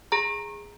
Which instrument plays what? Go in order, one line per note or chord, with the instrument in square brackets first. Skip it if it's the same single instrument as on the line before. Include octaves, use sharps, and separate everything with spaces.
[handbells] G#4 A#5